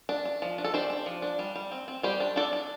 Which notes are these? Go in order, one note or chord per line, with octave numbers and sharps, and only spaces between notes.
D4
D4
F3
D4
A4
D4 G4 C5
D4
F3
D4
G3
G3
C4
C4
G3 G4 C5
D4
D4 A4 D5
D4